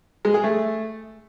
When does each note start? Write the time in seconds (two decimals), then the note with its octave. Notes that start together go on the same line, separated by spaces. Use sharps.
0.25 G#3
0.34 G#4
0.44 A3